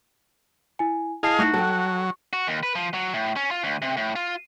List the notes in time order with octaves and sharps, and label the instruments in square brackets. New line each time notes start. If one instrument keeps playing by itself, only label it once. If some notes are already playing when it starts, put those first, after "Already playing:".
[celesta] E4 G#5
[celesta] E4 A5 C7 [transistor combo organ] G#4 D#5 F5
[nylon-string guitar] A3 D#4 [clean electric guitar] F#4
[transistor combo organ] F#3 [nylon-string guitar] A4 G5 [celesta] A5
[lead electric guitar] F#4
D#2
B4
F3
F#3
A2
C#4
F4
D2
C3
A2
F4